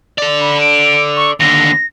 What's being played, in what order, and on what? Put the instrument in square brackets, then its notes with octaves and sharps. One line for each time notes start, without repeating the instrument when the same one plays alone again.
[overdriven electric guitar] A4 D5
[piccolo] B5
D7
C#6
[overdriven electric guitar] D#2 D3 [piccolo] A#6